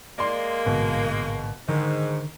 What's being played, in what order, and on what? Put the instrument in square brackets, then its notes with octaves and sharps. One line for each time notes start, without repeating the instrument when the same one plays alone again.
[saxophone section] G#3 A#3 [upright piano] D5 C6
[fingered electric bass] A1 G#2 D3 [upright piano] B2
[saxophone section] G#2 [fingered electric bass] D3 [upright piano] D#3